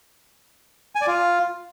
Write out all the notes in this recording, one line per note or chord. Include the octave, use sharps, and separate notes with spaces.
G#5
D5
F4